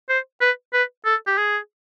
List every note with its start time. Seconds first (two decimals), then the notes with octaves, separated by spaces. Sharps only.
0.09 C5
0.41 B4
0.73 B4
1.05 A4
1.27 G4
1.38 G#4